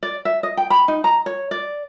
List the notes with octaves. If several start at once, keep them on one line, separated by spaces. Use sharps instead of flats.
D5
E5
D#5
G5
B5
D#4
A#5
C#5
D5